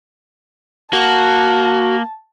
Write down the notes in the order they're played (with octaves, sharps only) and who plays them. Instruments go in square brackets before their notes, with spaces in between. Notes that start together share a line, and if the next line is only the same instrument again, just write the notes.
[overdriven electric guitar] A#3 [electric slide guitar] F#4 [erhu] A5